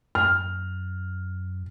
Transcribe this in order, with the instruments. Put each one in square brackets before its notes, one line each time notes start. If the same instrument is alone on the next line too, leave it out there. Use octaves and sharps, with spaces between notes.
[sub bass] F#2 [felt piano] F6